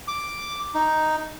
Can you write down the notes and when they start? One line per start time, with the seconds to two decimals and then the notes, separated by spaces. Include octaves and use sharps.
0.08 D6
0.75 D#4